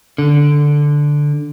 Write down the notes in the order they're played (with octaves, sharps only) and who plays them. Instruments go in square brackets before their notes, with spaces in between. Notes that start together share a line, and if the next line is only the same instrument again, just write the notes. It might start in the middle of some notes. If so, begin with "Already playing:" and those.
[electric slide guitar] D3